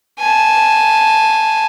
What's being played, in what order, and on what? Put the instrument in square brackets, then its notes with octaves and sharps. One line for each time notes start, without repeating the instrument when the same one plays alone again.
[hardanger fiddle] G#5 A5